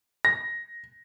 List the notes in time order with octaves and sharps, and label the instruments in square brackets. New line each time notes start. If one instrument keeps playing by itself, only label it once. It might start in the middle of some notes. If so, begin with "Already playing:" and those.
[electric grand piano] A#6